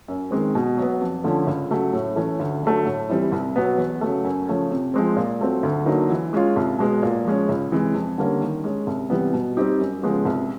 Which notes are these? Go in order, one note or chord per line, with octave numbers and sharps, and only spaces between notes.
F#2
D#3 G#3 C4
B2
F#3 B3
F2
D3 F3 A3 C#4
C#2
C#3 F#3 A3
A2
E3 A3 C#4
D2
D3 F#3 A3
A2
E3 G3 C4 E4
C2
B2 F#3 B3
E2
C#3 F#3 A3
F#2
C#3 F3 A3 C#4
C3
F3 G#3 C4
A#2
F#3 A3 C4
D2
D3 F#3 A#3 D#4
E3
G#3 C#4 F4
C2
B2 G#3 B3
A#2
F3 G#3 C#4
C#2
C3 E3 G#3
F2
D3 G3 A#3 C#4
D#3
G#3 C#4
C2
C3 E3 G3 B3
B2
G3 C4 D#4 G4
F#2
C#3 F3 G#3 B3
C2